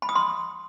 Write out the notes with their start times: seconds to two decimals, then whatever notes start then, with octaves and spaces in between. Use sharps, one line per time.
0.02 B5
0.09 D#6
0.15 C6